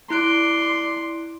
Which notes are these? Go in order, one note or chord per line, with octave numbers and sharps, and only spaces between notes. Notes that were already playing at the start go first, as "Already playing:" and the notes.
E4 D5 C6 F#6 D7